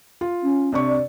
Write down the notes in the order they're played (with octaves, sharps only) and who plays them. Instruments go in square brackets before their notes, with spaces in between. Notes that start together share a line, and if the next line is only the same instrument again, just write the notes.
[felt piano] F4
[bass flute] C#4
[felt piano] C3 D4 C#6
[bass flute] D5